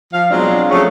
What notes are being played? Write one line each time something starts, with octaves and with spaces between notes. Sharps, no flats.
F3 F5
B2 F#3 G#3 C4 D4 F4
F3 F#3 A3 C#4 G#4 C#5